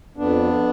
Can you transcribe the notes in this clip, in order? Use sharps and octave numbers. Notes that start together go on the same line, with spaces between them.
F2 B3 D4